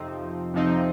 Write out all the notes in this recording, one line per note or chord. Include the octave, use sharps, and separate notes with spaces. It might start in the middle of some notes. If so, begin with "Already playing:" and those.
Already playing: F2 C3 F3 C4 D#4
F2 C3 F3 C4 D#4